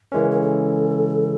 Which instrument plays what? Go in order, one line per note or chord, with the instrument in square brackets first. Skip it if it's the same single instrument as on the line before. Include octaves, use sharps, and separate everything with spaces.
[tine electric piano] C#3 E3 G#3 C#4 [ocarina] A#4
[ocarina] A#4
A4